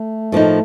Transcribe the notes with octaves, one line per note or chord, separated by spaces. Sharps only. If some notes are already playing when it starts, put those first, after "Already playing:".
Already playing: A3
A2 F3 A#3 D#4